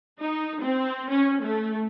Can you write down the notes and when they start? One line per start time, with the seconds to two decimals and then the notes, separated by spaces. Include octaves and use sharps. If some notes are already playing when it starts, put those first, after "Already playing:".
0.21 D#4
0.62 C4
1.10 C#4
1.43 A3